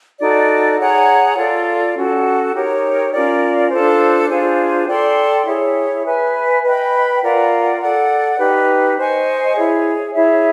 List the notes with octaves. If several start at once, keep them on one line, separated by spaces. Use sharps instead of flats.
D#4 F#4 A4 D5
G#4 C#5 F#5 A#5
F4 A4 D5
C#4 F#4 A4
D#4 G4 A#4 C#5
C#4 F4 A#4 D5
D4 F4 A4 C5
D4 F4 G#4 C5
A4 D5 G5 C6
E4 G#4 C#5
B4 E5 G#5
B4 D#5 G5 B5
F4 A#4 D5 F#5
A4 D5 F#5
D#4 G4 B4
C5 D#5 G#5 C#6
E4 G#4 C#5
E4 G#4 C#5 E5